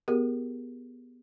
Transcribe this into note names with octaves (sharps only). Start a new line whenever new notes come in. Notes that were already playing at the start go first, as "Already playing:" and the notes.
B3 G4 G#4 A#4